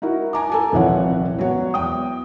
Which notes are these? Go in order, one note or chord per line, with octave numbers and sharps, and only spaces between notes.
D#4 E4 F#4 A#4
G#5 A#5 D6
A4 G#5 A5
D#1 C2 E3 F3 C#5 F#5
F#3 B3 C#5 F#5
E2 G5 D#6